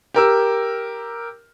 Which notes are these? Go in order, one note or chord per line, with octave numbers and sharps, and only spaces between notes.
G4 A#4 E6